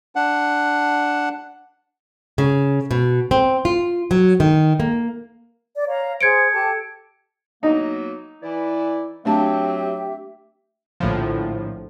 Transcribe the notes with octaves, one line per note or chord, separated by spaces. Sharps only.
D4 F#5
C#3
B2
C4
F4
F#3
D#3
A#3
D5
C#5 F5 A#5
G#4 C5 G#6 C#7 D7
G4 A4 A5
F#3 A#3 B3 D#4
E3 E4 D5
F#3 A3 C4 D4 G4 E5 A5
A#1 A2 D3 F3